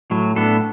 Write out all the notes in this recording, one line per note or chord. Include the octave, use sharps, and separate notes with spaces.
A2 F#3
A2 B3 D4 A4